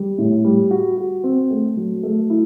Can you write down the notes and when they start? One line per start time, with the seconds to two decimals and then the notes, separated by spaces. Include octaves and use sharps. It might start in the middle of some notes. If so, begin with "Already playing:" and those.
Already playing: G3
0.18 A2
0.44 G3
0.71 F#4
0.97 F#4
1.24 C4
1.50 A3
1.76 F#3
2.03 A3
2.30 E4